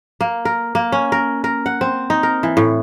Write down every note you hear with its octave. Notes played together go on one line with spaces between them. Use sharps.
A#3
A#4
A#3
C#4
A#4
A#4
F#5
C4
D#4
A#4
E3
A2